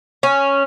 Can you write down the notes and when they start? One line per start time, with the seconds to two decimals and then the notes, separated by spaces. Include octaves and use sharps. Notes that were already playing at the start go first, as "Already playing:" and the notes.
0.23 C#4